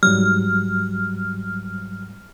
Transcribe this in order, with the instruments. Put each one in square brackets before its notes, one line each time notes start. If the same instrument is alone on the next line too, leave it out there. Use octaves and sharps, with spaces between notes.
[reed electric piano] G#2 F#3 G3 [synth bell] F6